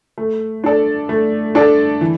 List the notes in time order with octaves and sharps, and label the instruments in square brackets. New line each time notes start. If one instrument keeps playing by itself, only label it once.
[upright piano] A3
D4 A4 D5
A3
D4 A4 D5
E3